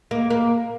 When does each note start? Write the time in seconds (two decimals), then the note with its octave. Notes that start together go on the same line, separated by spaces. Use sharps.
0.11 A#3
0.30 A#3